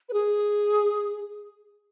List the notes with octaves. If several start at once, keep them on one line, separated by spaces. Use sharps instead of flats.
B4
G#4